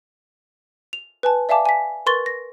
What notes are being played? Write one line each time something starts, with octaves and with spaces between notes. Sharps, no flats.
F7
B4 G#5 A5
D5 E5 F5 G#5 A5 D6
G#5 B6
A#4 B4 C6 C#6 A6 G7
A#6